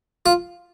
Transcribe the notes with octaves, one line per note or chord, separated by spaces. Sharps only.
F4